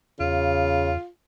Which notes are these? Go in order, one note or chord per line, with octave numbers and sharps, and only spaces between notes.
E2 C#3 F4